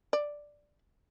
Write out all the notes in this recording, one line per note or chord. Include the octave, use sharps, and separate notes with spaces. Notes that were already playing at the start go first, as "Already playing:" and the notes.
D5